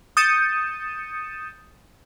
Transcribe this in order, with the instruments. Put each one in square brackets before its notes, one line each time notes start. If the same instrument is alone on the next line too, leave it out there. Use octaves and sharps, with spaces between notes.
[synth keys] D#6 G6 A6 C#7 D#7 E7